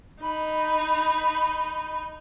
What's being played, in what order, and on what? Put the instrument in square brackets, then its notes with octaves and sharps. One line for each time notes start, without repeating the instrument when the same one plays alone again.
[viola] D#4 [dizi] B5